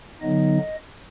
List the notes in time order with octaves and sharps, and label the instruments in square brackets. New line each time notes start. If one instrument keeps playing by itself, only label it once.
[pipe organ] D3 F#3 B3 D#4 D#5